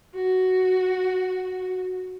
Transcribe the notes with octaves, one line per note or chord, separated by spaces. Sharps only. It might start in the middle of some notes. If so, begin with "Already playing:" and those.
F#4